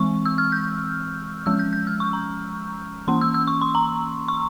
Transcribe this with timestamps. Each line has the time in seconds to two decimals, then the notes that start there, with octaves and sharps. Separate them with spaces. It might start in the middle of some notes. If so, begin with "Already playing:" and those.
Already playing: E3 G#3 C4 C#6
0.25 E6
0.38 F6
0.52 G6
1.46 F3 G#3 C#4 E6
1.59 G6
1.73 G6
1.87 F6
2.00 C#6
2.13 A#5
3.08 E3 A#3 C#4 C6
3.21 E6
3.34 E6
3.47 C#6
3.61 C6
3.75 A#5
4.28 C#6